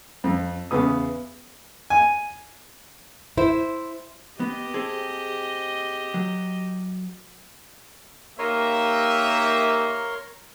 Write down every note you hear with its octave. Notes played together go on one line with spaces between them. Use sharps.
F2
E2 C#3 B3 D#6
G#5
E4 C5
B3 G4 D#5
C4 G#4 A4
F#3
A#3 D#4 G4 A#4 C#5 E5 C6